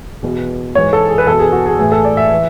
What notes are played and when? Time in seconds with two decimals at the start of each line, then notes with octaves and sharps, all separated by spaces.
0.23 E2 B2
0.75 G#2 E3 C#5
0.93 A4
1.09 G#4
1.18 B4
1.27 E2 B2 A4
1.39 G#4
1.52 F#4
1.66 G#4
1.79 A2 E3 G#4
1.92 A4
2.05 D5
2.17 E5
2.33 E3